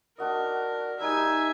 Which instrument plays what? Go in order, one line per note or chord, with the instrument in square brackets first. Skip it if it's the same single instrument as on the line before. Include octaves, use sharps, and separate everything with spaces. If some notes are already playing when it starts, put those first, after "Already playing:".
[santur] D4 F#4 D#5 [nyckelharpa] A#4
[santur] G3 D#4 [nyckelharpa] E5 G#5